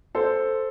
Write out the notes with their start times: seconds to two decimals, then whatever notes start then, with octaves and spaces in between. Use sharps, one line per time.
0.15 A4 C5